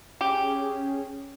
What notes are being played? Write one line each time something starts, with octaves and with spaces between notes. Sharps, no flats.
C#4 G4 G#4